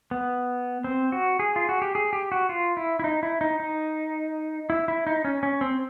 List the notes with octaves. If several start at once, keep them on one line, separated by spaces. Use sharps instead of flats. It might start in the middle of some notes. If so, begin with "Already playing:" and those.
B3
C4
F#4
G#4
F4
F#4
G4
G#4
G4
F#4
F4
E4
E4
D#4
E4
D#4
D#4
E4
E4
D#4
C#4
C#4
C4